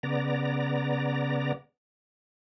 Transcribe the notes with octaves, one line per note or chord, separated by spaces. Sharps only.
C#3 B3 D5 A#5